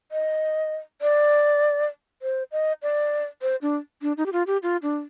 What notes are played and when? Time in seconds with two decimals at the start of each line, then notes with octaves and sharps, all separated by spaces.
0.12 D#5
1.02 D5
2.22 C5
2.52 D#5
2.83 D5
3.42 C5
3.62 D4
4.02 D4
4.17 D#4
4.26 G4
4.33 F4
4.47 G4
4.63 F4
4.82 D4